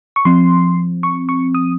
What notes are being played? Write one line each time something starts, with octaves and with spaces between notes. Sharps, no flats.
C#6
F3 C4 C6
C#6
C#6
D#6